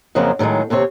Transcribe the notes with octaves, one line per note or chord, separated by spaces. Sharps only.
F2 C#3 F3 F#3 A#3
A2 D#3 F3 F#3 G#3
D#2 C3 C4 C#5